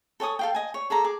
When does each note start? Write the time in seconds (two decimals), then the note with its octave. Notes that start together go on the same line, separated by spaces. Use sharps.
0.20 A4 C#5 G#5 D#6
0.39 A4 F5 G5
0.55 D#5 G#5
0.74 C#5
0.90 G#4 A4 D5 A#5
1.04 G#4 D6